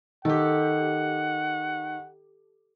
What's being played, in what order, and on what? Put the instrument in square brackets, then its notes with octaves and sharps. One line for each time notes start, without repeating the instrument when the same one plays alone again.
[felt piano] D#3 [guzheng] G4 A4 [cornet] F#5